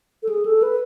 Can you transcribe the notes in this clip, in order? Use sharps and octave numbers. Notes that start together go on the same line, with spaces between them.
A4
G#4
A4
B4